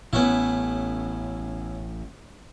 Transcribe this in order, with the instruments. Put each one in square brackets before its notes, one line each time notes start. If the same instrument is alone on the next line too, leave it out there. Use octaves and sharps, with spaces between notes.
[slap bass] A1 A2 [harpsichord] B3 C#4 E4